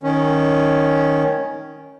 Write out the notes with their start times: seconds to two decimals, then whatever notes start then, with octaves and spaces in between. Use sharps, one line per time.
0.03 D#3 C#4